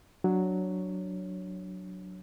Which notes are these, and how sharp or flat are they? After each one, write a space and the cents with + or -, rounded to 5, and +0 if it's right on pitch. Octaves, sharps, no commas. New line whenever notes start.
F#3 +0 D4 +0 C#5 +0